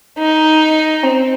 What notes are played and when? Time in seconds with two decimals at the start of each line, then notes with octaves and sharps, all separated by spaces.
0.19 D#4
1.03 C4